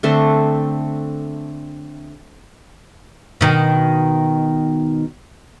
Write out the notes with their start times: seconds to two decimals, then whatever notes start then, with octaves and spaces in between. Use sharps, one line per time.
0.03 D3 A3 C4
3.41 B2 D#3